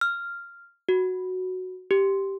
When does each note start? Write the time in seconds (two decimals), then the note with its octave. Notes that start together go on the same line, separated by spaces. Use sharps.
0.01 F6
0.89 F#4
1.91 G4